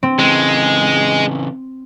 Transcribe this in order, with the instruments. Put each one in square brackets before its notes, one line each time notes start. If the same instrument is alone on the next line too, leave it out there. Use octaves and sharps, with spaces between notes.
[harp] C4
[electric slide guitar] C#3 E3 [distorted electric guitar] G#3